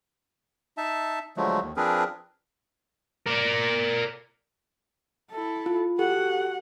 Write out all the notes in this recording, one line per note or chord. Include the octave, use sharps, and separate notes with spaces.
D#4 E5 A5
D3 F3 F#3 G#3 A3
D#2
F3 C4 D4 G#4 A#4 B4
A#4 D5
E4 A4
F4
F#4 G4 A4 F#5